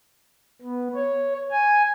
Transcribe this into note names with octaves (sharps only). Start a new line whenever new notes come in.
B3
C#5
G#5